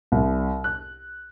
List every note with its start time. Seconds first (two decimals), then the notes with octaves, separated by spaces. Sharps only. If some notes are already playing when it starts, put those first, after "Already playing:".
0.12 C2
0.64 F#6